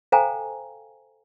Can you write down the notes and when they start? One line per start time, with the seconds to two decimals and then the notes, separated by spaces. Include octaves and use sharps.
0.12 A4 C5 F5 G5 G#5 A#5